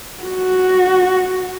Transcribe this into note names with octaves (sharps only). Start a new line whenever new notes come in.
F#4